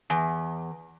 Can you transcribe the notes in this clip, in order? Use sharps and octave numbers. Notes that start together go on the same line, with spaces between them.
E2 G#5